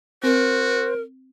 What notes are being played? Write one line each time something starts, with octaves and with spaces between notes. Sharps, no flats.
C4 F#4 A#4 C5